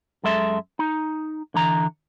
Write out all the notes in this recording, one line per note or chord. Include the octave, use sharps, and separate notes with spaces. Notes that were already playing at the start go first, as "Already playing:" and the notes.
F#2 G#3 A4 E5 C6
D#4
D3 E3 A#5